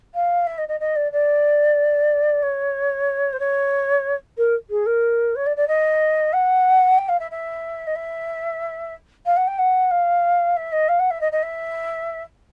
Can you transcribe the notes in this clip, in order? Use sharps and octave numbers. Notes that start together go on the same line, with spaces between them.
F5
E5
D#5
D#5
D#5
D5
D5
C#5
C5
C#5
A#4
G#4
A#4
C#5
D5
D5
D#5
F#5
G5
F5
E5
E5
D#5
E5
F5
F#5
G5
F#5
F5
E5
D#5
F5
F#5
E5
D#5
D#5
E5